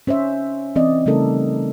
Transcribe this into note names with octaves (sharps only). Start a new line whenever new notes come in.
C#4 C5 C#5 E5
E3 C4 D5 D#5
C#3 G3 A3 D#4 A4 A#4